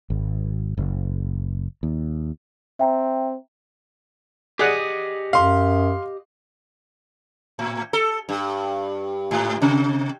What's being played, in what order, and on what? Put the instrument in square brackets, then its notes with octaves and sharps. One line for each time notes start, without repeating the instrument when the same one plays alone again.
[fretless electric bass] G#1
F#1
D#2
[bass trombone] C4 [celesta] E5 G5 A#5
[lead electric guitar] G4 D#5 [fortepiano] G#4 D5 F#5
[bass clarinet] F#2 [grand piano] F5 C6
[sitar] A2
A4
G2
G#2
C3